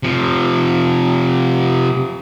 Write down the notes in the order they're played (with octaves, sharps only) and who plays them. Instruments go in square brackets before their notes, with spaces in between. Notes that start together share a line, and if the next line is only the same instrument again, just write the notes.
[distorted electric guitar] C3 F3